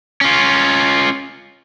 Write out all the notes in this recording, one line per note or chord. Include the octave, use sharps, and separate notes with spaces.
C#4 F4